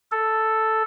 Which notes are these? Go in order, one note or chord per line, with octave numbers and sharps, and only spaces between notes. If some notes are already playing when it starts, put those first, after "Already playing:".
A4